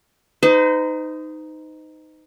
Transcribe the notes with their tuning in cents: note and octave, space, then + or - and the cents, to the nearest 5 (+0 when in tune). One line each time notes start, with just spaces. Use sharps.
D#4 +0 C5 -45